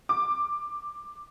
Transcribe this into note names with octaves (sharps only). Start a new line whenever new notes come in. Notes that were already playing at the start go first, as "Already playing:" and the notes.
D6